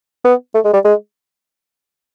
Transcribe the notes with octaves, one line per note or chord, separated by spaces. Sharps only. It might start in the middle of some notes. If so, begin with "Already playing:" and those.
B3
A3
G#3
G3
G#3